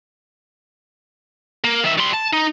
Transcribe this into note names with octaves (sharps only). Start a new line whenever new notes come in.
A#3
D#3 E5
G3 C6
A5
D#4